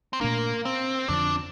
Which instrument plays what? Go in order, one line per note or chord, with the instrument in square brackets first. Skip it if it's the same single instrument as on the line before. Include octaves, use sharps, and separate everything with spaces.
[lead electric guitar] C4
[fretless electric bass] A#2 A3 D4 [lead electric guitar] A#3
[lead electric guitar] C4
[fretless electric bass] F2 D3 F3 [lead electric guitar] D4